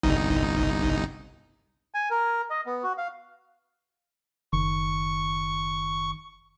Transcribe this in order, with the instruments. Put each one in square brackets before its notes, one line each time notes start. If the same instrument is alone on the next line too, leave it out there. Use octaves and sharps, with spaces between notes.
[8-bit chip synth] G1 C2 D#4
[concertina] G#5
A#4
D#5
B3
F#4
F5
[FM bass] F#1 [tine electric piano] D#3 [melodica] C#6